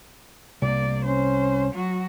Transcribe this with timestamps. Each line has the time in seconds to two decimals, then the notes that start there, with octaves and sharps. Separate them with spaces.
0.62 C2 A#3 D5
1.05 C#4 C5
1.71 F#3 F#4